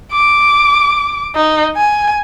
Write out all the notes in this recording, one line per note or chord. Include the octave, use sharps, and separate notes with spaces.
D6
D#4
G#5